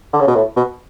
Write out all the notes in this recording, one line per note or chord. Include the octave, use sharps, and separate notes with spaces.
D3
C#3
B2
A2
B2